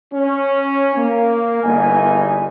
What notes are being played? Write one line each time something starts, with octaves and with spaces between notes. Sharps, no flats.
C#4
A#3
G1 E2 G2 D#4 G#5